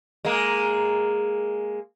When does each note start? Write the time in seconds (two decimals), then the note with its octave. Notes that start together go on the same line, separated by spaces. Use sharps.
0.25 G#3 A#3